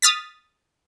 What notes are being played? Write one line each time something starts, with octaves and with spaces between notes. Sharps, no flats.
D#6 F6 A6 B6